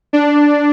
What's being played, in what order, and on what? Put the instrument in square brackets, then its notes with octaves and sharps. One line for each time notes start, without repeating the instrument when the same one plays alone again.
[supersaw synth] D4